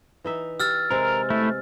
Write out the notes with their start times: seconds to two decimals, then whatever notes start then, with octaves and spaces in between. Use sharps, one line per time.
0.24 E3 D#4 E5
0.60 G4 E6 F6 A6
0.90 C3 G#3 A#4
1.30 A3 E4